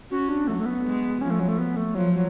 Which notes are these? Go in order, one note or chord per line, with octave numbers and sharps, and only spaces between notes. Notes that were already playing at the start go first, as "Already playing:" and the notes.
C#4 F#4
D4
F#3 A3
A3
B3
G#3
F3 C#4
A3
F#3
A3
B3
A3
F3 F#3
F#3